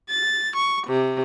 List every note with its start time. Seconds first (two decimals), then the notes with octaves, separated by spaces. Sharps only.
0.10 A6
0.56 C#6
0.86 C3